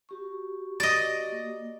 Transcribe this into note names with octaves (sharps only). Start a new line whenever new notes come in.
F#4 G4 C#6
D5 D#5
A#3